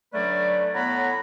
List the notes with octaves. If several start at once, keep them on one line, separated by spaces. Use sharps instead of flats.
D3 F#3 A3 C#4 B4 D5
A2 B3 C#5 F#5 A#5 B5